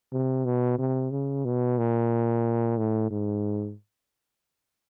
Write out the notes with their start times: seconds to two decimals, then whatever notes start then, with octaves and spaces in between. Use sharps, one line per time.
0.12 C3
0.45 B2
0.79 C3
1.11 C#3
1.45 B2
1.78 A#2
2.78 A2
3.11 G#2